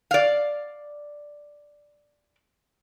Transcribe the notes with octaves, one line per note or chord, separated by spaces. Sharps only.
D5 F5